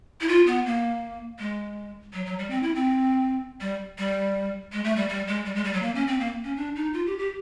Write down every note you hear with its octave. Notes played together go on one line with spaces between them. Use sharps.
E4
F4
B3
A#3
G#3
F#3
F#3
G3
C4
E4
C4
G3
G3
G#3
A3
G3
G3
G#3
G3
G#3
G3
F#3
A#3
C#4
C4
A#3
C#4
D4
D#4
F4
G4
G4